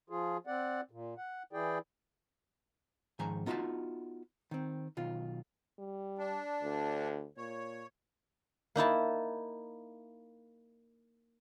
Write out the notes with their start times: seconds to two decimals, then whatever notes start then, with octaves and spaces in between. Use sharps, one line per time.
0.10 F3 F4 G#4
0.47 C4 D5 F#5
0.91 A#2
1.18 F#5
1.53 E3 E4 G#4 D5 G5
3.19 G#2 D#3 F3 G#5 A#5
3.46 B3 D#4 F4 F#4 E5 A5
4.51 D#3 C4
4.97 B1 D#3 F4
5.79 G3
6.18 D4
6.63 D2
7.37 A#2 C#5
8.76 A#3 D#4 E4 A5